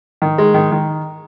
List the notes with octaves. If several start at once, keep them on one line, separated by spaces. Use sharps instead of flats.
D#3
G#3
D#3
D#3